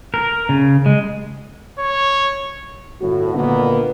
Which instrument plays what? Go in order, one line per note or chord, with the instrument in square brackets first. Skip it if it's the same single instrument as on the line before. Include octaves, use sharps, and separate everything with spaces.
[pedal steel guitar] A#4
C#3
G#3
[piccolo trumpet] C#5
[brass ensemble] G1 A2 F#4
A#2 D3 D#3 A#3 B3